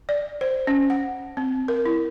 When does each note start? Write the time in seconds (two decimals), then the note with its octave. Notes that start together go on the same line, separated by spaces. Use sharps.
0.09 D5
0.41 C5
0.67 C#4
0.90 F#5
1.37 C4
1.68 A#4
1.85 E4